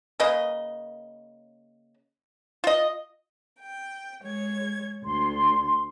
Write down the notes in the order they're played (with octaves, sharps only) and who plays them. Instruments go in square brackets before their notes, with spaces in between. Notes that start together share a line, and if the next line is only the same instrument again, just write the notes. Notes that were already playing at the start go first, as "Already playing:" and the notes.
[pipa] C#3 A#3 B4 D#5
F4 D#5
[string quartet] G5
G#3 C#5 G#6
[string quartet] D2 [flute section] C6